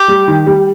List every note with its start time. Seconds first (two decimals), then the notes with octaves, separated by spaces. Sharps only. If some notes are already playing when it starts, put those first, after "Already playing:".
Already playing: G4
0.08 G3
0.28 D#3
0.46 G3